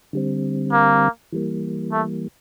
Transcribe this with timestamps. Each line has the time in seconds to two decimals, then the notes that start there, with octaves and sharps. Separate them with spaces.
0.13 D3 G3 C4
0.72 A#3
1.33 E3 G3 A#3
1.92 A3